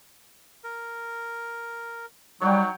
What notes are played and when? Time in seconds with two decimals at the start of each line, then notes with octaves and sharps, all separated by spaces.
0.64 A#4
2.41 F#3 G3 D#4 C#5 F#5 G5